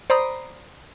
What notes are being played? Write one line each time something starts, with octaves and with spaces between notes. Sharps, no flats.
C5 D5 A#5 B5 D#6